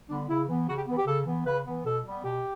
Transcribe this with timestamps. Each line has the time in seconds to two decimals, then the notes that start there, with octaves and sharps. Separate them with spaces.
0.09 D3 G3 B3 D4
0.29 C#3 E4
0.48 E3 B3
0.68 C#3 F#4
0.77 G4
0.87 E3 B3
0.98 G4
1.07 C#3 A4
1.26 E3 B3
1.46 C#3 B4
1.66 E3 B3
1.85 B2 A4
2.05 G3 B3
2.24 B2 G4